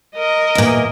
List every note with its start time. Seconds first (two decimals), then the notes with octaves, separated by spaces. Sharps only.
0.16 A#4 D#5
0.55 E2 A#2